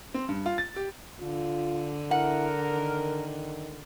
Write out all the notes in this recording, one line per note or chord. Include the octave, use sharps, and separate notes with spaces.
C4
G2
F4
A6
G4
D3 F4
E4 A#4 F#5
D#3